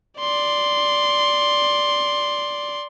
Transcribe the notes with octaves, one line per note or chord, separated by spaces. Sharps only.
D5 C6